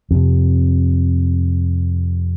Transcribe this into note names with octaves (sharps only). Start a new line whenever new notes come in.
F2 C3